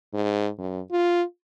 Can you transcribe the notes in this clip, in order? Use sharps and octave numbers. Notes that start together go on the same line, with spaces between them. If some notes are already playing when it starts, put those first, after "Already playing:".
G#2
F#2
F4